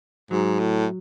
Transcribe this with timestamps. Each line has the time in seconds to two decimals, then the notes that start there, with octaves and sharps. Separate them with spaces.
0.31 G#2 F#3
0.60 A2